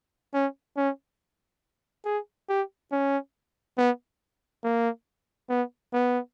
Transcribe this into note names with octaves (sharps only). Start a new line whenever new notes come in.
C#4
C#4
G#4
G4
C#4
B3
A#3
B3
B3